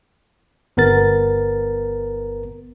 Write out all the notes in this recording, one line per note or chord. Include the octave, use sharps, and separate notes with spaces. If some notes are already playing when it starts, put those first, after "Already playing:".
G1 B3 A#4 A6